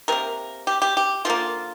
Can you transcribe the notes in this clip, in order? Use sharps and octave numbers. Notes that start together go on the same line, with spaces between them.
C3 A#3 A#4
G4
G4
G4
D3 F3 A#3 F4